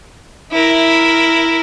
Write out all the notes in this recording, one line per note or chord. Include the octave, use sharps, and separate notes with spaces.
E4 A#4